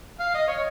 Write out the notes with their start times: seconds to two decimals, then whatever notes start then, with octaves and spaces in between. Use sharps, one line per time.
0.20 F5
0.34 D#5
0.48 C#5